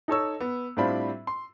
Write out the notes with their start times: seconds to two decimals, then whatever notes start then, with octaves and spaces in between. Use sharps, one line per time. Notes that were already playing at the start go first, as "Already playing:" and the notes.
0.08 D#4 A4 C#5 E6
0.40 B3
0.77 A2 G3 C4 D4 F4 B5
1.27 C6